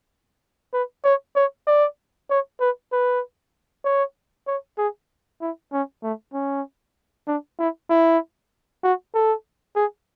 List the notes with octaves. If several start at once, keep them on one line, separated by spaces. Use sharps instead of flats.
B4
C#5
C#5
D5
C#5
B4
B4
C#5
C#5
G#4
E4
C#4
A3
C#4
D4
E4
E4
F#4
A4
G#4